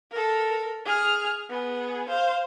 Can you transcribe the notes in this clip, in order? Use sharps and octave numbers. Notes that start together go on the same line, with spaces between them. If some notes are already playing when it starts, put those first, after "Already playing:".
A4 A#4
G#4 F6
B3 G#4
C5 F5